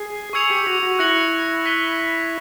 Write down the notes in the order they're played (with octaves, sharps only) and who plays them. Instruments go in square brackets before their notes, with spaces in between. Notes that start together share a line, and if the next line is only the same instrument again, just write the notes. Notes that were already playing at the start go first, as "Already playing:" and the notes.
Already playing: [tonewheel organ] G#4
[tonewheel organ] G#4 [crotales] C#6 E6 G#6 C#7 F7
[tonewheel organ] G4
F#4
F#4
[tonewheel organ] E4 [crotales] F#6 A#6 C#7 F#7
[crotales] F#6 B6 D#7 G7